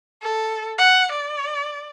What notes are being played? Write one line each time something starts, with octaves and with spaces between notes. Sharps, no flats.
A4
F#5
D5